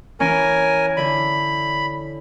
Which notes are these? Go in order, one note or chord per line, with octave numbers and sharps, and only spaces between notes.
E3 C#4 A#4 G#5
D3 E4 B5